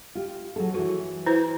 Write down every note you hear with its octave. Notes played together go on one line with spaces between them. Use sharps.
F4 G4
F#3 G#4 A4
E3 F#4 C#5
E4 B4 C5